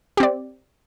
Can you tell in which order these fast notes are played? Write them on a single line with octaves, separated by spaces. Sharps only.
G4 C4 D5